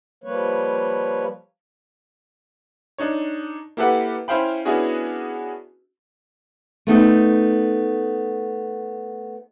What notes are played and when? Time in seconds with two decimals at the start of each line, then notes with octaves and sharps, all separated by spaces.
0.24 F3 G3 A#3 B4 C#5
2.98 D4 D#4 C#5
3.77 A#3 E4 G4 A4 B4 F#5
4.28 C#4 E4 C5 F5 G5 B5
4.65 B3 C#4 D4 E4 F#4 G#4
6.87 A3 B3 D#4